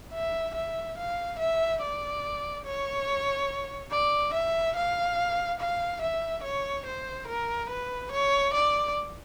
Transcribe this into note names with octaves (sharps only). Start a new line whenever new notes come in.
E5
E5
F5
E5
D5
C#5
D5
E5
F5
F5
E5
C#5
C5
A#4
B4
C#5
D5